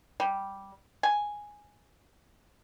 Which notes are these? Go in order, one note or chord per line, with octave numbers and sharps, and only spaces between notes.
G3
G#5